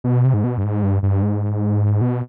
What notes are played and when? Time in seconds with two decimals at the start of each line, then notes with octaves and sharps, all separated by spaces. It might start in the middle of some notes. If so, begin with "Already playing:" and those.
0.04 B2
0.25 C3
0.34 G#2
0.44 B2
0.58 G2
0.64 G#2
0.83 G2
1.03 G2
1.22 G#2
2.01 B2